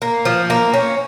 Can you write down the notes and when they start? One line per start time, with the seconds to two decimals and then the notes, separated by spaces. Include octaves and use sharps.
0.02 A#3
0.25 F3
0.50 A#3
0.74 C#4